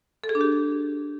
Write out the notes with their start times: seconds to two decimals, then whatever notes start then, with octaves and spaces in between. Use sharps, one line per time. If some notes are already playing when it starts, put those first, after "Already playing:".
0.24 A4
0.29 G#4
0.35 D4
0.41 G4